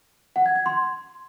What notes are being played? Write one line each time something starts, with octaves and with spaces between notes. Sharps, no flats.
F#5
G#6
G#6
C6